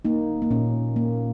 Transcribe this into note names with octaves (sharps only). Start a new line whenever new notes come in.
A#3 D#4
A#3
A#2 C#4
A#3